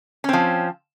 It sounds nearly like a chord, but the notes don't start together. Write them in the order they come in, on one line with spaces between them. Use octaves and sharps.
C#4 C4 F3